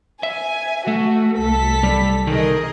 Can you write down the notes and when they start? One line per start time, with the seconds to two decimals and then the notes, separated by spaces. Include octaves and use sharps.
0.23 E5 G#5
0.88 A3 F#4
1.38 C2 A4 B6
1.83 G3
2.27 C2 D#3 G#4 A#4 D#5